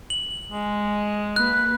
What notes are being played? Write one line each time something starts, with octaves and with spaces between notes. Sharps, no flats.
F#7
G#3
A#3 B4 F#6